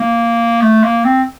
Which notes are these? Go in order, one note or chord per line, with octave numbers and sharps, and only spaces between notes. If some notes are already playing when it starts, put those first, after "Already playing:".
Already playing: A#3
A3
A#3
C4